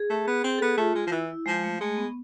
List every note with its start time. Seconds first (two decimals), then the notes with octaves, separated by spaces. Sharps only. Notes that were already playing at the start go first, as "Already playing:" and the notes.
Already playing: G#4
0.10 A3
0.27 B3
0.44 C4
0.58 B3 A4
0.68 G#4
0.78 A3 F4
0.95 G#3
1.07 F3
1.12 E3 E4
1.46 F3 G#3
1.64 A3
1.81 G#3 A3
1.97 B3